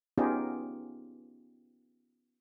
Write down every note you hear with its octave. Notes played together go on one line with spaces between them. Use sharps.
B3 C#4 D#4 F4 G4 G#4